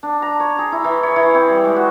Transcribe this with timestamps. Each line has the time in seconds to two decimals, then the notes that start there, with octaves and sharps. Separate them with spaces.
0.03 D4
0.22 A#5
0.40 C#5
0.59 G#4
0.72 E4
0.84 E3
1.03 C#5
1.16 E3
1.35 C4
1.50 G3
1.65 G#3
1.76 F#4